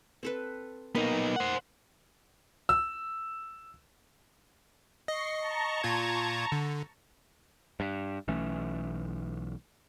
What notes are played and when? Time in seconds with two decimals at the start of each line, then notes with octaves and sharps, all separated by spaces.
0.23 C4 A4 B4
0.95 A#3 B3 D#4
1.36 C5 F#5
2.69 E6
5.08 D#5 C#6 C7
5.40 A5 A#5 C#6
5.84 A#2 F4 G#6
6.52 D3
7.80 G2
8.28 B1 E3 A3 C#4